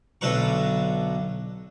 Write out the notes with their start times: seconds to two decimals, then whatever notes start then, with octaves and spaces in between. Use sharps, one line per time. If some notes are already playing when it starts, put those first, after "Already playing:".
0.21 B1 D3 A4 B4 A#5 C#6